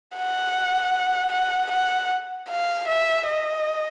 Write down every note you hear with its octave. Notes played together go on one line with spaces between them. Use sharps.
F#5
F#5
F#5
F5
E5
D#5